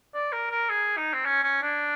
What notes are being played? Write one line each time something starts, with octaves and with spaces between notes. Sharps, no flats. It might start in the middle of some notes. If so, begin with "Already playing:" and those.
D5
A#4
A#4
G#4
D#4
C4
C#4
C#4
D4